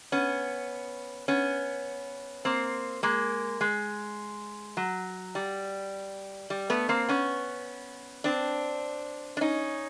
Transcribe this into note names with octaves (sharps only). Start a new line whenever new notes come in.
B3 C#4
B3 C#4
A#3 C4
G#3 A#3
G#3
F#3
G3
G3
A3 B3
A#3 C4
B3 C#4
C4 D4
D4
C#4 D#4